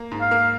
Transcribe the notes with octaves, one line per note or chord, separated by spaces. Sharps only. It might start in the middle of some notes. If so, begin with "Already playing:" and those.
Already playing: A#3
G#2
F5
A#3